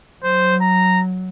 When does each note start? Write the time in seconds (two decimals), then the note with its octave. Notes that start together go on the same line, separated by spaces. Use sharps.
0.24 F#3 C5
0.62 A#5